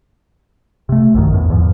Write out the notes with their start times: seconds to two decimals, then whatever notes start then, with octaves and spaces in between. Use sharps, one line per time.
0.89 C3 A3
1.14 A#1 F#2 D#3
1.34 E2 A2
1.50 E2 G#2 E3 F3